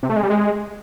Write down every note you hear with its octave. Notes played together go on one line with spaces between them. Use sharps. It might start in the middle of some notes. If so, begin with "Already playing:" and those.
C3
A3
G#3
G3
G#3